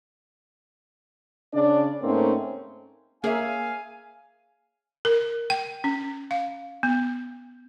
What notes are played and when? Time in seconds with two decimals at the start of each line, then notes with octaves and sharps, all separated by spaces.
1.54 C#3 D4 D5
2.03 G#2 A3 A#3 C4 C#4 D#4
3.24 A#3 G#4 C#5 E5 F5 G#5
5.05 A#4
5.50 G5
5.84 C#4
6.31 F5
6.83 B3